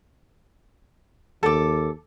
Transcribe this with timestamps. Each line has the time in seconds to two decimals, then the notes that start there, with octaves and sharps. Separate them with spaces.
1.43 D#2 A4 D6